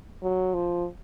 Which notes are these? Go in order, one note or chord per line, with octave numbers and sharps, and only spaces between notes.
F#3
F3